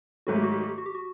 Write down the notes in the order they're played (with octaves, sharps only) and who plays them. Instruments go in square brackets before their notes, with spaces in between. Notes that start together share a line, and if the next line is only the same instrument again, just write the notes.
[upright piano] G#2 D#3 F#3 A3 [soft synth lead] F#4
[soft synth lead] G4
F#4
G4
F#4
G4
F#4
G4
F#4